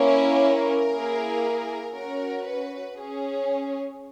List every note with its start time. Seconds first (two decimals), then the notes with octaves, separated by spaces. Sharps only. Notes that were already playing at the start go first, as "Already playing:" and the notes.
Already playing: A#3 C#4 E4
0.40 A#4
0.92 A#3 E4 G#4
1.94 C#4 F#4 A#4
2.46 B4
2.97 C#4 G#4